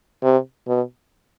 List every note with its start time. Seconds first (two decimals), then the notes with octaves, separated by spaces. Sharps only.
0.23 C3
0.68 B2